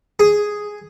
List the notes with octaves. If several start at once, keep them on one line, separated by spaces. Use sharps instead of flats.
G#4